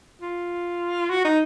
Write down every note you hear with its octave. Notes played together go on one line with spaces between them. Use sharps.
F4
F#4
D#4